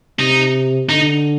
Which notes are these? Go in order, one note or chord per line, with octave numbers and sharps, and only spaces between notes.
C3 D#4
D3 D#4